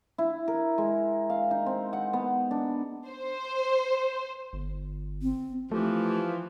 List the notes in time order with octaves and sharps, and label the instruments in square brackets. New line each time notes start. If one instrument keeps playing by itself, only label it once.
[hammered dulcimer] E4
A#4
G#3
F5
D#4
C4
F#5
B3
D4
[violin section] C5
[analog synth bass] G1
[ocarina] C4
[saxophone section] E3 F3 [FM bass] A3 [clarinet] G4